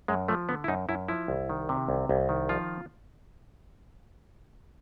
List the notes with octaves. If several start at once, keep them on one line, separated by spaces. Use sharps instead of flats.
F#2 G#3
F3 A3
D3 B3
E4
F#2 D#4
F#2 E4
F3 E4
C2
D#3
C3
C2
C2
D#3
F3 F4